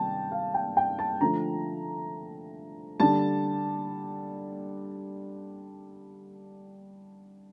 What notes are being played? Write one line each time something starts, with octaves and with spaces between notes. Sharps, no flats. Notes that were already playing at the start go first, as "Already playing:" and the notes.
Already playing: C3 D#3 G3 G5 A5
F5
G5
G5
A5
D3 F3 A3 A#5
D3 G3 A5